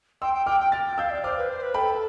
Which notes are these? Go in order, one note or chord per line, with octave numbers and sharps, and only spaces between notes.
G5 C6 E6
G5
G5 D6 F6
G5
G5 F6 A6
G5
F5 E6 G6
D5
C5 D6 F6
B4
C5
B4
A4 G5 B5